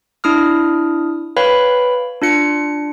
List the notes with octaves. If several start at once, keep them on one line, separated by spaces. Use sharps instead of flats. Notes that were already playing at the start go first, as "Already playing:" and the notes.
D4 E4 D#6 F6
B4 C#5 F5 G5 B5
D4 F4 C#7